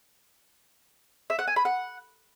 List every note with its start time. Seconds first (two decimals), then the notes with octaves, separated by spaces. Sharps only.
1.30 E5
1.39 F#5
1.47 G#5
1.56 B5
1.65 F#5